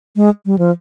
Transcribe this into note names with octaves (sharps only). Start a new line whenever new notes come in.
G#3
G3
F3